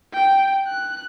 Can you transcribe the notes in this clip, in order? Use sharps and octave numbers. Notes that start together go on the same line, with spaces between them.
G5
F#6